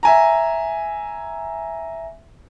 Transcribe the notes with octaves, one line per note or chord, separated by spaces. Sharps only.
E5 G#5 A#5